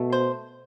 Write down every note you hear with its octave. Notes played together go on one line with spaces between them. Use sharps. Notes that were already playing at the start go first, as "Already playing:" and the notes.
Already playing: B2 A3
C5